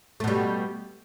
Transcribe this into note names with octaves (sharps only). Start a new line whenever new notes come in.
B2 G3 A3